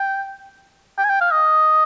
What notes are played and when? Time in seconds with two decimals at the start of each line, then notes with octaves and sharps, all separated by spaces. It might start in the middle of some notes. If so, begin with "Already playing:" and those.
Already playing: G5
0.98 G5
1.05 G#5
1.09 G5
1.21 F5
1.32 D#5